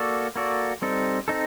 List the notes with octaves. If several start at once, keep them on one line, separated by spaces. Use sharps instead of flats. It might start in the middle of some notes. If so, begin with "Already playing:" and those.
Already playing: A#3 F#4 A4 D5
A#3 F#4 A4 D5
G3 C4 D#4 A4
C4 D#4 A4